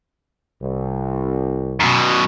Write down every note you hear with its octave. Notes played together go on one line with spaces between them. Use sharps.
C2
F#2 B2